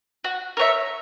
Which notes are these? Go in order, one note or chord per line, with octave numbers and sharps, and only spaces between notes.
F#4
A#4 C#5 E5